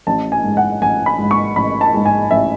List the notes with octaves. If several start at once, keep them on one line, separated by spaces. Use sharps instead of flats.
A1 A5
G#5
G#2 G#3
F#5
A1 G#5
B5
G#2 G#3
C#6
A1 B5
A5
G#2 G#3
G#5
A1 E5